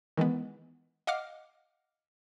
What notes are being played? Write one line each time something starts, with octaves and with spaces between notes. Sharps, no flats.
D#3 E3 G#3 B3
D#5 F5 F#5 D6 F6